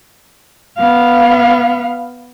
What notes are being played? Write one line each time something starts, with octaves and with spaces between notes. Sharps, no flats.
B3 F5